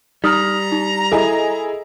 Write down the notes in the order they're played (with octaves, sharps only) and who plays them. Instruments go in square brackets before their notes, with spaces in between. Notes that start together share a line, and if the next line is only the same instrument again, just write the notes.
[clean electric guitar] G3 [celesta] D#4 D#6 F6 [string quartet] A#5
[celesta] D#4
[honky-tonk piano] E4 G#4 D#5 [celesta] A4